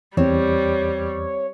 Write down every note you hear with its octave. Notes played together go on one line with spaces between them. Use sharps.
E2 G3 C4 C#5